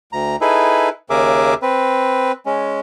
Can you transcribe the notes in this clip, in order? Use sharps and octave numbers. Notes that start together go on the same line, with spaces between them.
D2 A#5
D#4 E4 G#4 A4 B4
D#2 C#3 G#4 A#4 E5 D6
C4 B4
G#3 C#4